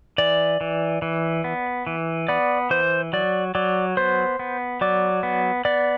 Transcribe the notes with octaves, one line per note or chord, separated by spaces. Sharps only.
E3 D5
E3
E3
B3
E3
B3 D5
E3 C5
F#3 D5
F#3 D5
B3 C5
B3
F#3 D5
B3
B3 D5